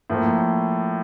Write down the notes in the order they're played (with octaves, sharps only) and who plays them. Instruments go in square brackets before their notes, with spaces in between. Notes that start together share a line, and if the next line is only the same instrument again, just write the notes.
[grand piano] A2 F3 A#3